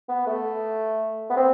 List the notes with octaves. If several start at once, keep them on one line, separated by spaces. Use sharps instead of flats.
B3
A3
B3
C4